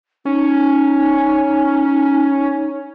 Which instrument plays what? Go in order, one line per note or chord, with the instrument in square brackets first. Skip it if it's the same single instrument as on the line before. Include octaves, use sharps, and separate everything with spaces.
[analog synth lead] C#4 [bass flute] D#4